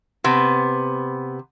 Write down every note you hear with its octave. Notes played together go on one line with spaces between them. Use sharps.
C3 B3